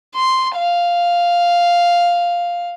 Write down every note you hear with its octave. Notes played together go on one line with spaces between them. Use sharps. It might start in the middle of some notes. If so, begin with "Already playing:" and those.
C6
F5